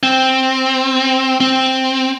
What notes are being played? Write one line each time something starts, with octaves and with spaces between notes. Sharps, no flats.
C4
C4